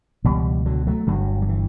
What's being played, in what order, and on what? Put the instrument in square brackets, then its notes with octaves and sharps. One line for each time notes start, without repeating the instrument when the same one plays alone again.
[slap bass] C#2 B2 E3 G3
D3 F#3
F#3 A3
G1 G2 D3 F#3
F#3
E3